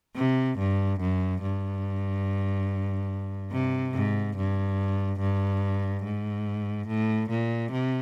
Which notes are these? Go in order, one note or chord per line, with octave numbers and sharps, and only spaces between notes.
C3
G2
F#2
G2
C3
G#2
G2
G2
G#2
A2
A#2
C3